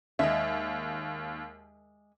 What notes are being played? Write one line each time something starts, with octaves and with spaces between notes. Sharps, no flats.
D#2 G#3 E5